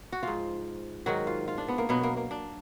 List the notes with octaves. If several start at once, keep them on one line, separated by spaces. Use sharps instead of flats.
F#4
F3 F4
G#2
G#2 D#3 F#3 F#4
F4
F4
D4
B3
A#3
B2 F#3 B3
A#3
A#3
D4